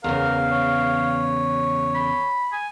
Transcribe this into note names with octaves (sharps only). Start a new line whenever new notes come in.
E2 C#3 A#4 F5
C#5
B5
G#5